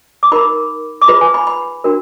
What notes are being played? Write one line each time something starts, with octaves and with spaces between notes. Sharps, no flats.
D6
D#4 A#4 B5
D6
F4 G#4 B4 B5
G#5
B5
B5
D4 F#4 A#4